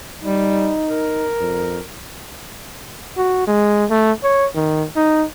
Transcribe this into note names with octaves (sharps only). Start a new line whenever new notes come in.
G3 D#4
A#4
F2
F#4
G#3
A3
C#5
D#3
D#4